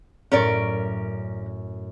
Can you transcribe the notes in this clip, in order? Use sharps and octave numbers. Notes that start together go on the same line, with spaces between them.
F#2 A2 C#4 A#4 D5